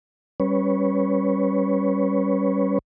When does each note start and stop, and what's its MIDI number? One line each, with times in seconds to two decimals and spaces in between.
0.40 2.79 55
0.40 2.79 61
0.40 2.79 71
0.40 2.79 73